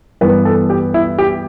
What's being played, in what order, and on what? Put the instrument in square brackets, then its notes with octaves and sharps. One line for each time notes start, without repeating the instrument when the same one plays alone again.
[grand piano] G2 E3 B3 B4
A4
G4
E4
G4